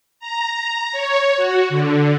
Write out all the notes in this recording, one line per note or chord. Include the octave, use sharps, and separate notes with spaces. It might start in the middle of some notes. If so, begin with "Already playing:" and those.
A#5
C#5
F#4
D3